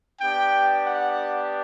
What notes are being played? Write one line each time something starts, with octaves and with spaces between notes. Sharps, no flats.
B3 D4 G4 G5
F#5